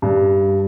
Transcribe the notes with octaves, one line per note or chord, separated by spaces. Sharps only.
G2